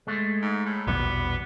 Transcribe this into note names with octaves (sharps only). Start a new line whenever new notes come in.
G#3 A3
G#2
A2
A#1 E2 B2 G3 B3